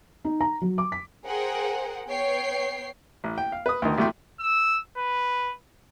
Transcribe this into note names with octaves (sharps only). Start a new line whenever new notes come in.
D#4
A#5
F#3
D6
B6
G#4 A#4 C5 F#5 G5
B3 C#5 G5 C7
A1
G5
F5
B4 D#6
D2 D#3
A1 F#3 A3 E4 G5 C6
E6
B4